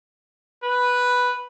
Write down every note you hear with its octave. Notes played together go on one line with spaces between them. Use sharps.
B4